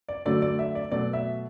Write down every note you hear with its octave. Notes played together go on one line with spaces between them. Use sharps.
D5
D3 F#3 A3 D5
D5
E5
D5
B2 F#3 A3 D5
E5